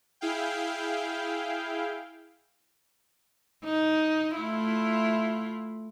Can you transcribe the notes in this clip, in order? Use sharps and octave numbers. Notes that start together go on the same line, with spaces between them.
E4 G#4 F5 G5
D#4
A3 E4 F4